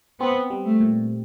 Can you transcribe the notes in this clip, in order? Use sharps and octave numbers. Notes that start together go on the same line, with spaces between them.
B3 C4
G3
A3
A#2